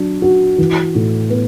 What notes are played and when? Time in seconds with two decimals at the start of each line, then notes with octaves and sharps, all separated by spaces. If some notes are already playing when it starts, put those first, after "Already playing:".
Already playing: F#3 D4
0.22 F#4
0.58 E3
0.95 A2
1.30 B3